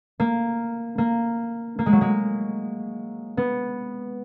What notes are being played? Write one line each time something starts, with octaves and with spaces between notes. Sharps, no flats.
A#3
A#3
A#3
G#3
F#3
G#3
B3